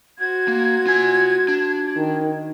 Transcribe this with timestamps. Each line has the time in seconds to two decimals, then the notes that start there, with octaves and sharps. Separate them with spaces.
0.19 F#4 C5 G#6
0.48 A#3
0.87 F4 G#5
1.48 D4
1.97 D#3